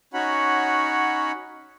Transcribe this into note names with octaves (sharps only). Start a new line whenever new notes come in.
C#4 D#4 F#4 C#5 F#5 B5